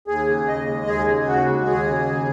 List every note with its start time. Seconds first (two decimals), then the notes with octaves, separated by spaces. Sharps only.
0.07 D#2 G#4
0.27 C#3
0.48 D#2 D#5
0.67 G#3
0.87 D#2 G#4
1.07 C#3
1.27 D#2 F#4
1.47 G#3
1.66 D#2 G#4
1.87 C#3
2.06 D#2